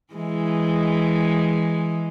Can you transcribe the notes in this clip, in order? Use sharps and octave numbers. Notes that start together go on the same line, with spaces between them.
E3 G#3